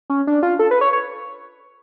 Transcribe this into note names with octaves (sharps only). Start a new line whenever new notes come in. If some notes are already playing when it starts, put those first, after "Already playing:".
C#4
D4
F4
A4
B4
C#5
C#5